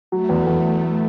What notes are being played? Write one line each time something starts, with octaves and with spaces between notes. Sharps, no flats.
F#3 A3
E2
E2